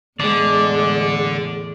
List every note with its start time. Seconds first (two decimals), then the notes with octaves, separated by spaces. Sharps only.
0.20 E2 A2 D3 G#3 D5